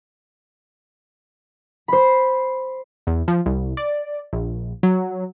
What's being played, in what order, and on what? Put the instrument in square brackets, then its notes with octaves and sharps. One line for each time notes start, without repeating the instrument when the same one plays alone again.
[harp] C5 B5
[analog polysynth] E2
F3
C2
D5
A#1
F#3